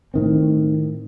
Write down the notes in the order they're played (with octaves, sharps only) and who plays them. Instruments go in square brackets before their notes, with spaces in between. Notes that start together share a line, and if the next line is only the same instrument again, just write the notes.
[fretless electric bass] A2 D#3 C4